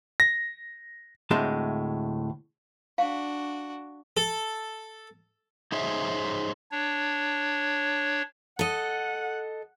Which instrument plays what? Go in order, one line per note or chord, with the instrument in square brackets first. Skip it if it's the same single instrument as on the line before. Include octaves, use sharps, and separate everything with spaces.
[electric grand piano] A#6
[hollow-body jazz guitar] D2 A2 G#3 C4 A5 C6
[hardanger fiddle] D4 F#4 [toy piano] F5
[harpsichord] A4
[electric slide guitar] D#4 G#4 C5 C#5 E5
[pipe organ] D4 C#5
[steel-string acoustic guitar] A4 D#5 [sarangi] F#5